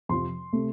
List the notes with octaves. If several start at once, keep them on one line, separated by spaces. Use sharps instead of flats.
F2 C3 F3 C6
C3 A3